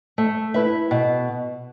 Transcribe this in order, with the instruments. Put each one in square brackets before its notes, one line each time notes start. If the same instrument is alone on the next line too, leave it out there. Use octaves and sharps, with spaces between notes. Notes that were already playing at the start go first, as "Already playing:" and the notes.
[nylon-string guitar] A3
E4 B4 E5
B2